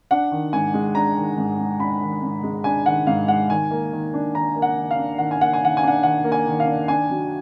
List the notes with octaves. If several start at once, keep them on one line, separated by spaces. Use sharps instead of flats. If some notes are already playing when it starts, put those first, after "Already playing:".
D4 F#5
D#3
G#2 G#5
G#3
D4 A#5
D#3
G#2
G#3
D4 B5
D#3
G#2
G#3
D4 G#5
D#3 F#5
G#2 F5
G#3 F#5
D#3 G#5
A#3
D#3
D4
D#3 A#5
A#3
F#5
D#3
F5
D4
D#3 F#5
G#5
A#3 F#5
G#5
D#3 F#5
G#5
D4 F#5
D#3 F#5
A#3
G#5
D#3
F5
D4
D4 G#5
F#3